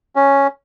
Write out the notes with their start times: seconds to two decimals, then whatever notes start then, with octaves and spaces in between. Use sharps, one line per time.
0.16 C#4